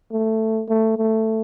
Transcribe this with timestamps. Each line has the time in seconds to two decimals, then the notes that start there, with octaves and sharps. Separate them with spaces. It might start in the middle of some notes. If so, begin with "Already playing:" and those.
0.11 A3
0.69 A3
0.96 A3